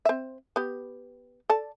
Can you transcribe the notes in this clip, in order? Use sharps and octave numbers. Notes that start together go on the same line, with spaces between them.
C4 E5
B3 G4
A4 D5 A5